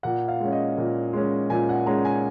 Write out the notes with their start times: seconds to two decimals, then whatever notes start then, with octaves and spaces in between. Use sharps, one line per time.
0.03 A#2 F#5
0.28 F5
0.40 G#3 C#4
0.52 D#5
0.78 A#2
1.13 G#3 C#4
1.50 A#2 G#5
1.69 F#5
1.86 G#3 C#4 A#5
2.05 G#5